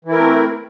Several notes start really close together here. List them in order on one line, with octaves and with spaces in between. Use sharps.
E3 E4 A#4 A3 C4